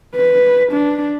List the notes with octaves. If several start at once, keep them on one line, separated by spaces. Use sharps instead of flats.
B4
D4